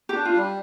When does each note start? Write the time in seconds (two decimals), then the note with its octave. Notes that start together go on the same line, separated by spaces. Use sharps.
0.09 G4
0.15 D4
0.25 F4
0.35 G3